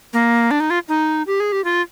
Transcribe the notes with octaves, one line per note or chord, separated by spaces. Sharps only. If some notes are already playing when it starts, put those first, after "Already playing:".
A#3
D4
D#4
F4
D#4
G4
G#4
G4
F4